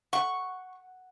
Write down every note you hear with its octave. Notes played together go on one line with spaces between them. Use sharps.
F#5 C#6